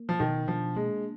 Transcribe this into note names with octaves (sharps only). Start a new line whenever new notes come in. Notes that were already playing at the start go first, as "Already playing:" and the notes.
Already playing: A#3
F3
B2 D#3
F3 D4
G#3 A#3